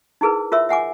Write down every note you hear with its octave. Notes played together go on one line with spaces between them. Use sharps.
D#4 E4 G#4 A#4 B4
F4 A#4 C#5 E5 E6
E5 F#5 G#5 D6